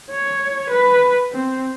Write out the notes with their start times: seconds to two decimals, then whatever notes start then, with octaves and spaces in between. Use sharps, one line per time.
0.11 C#5
0.70 B4
1.31 C4